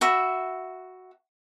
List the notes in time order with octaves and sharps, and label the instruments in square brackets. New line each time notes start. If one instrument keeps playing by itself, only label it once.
[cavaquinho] F#4 E5 B5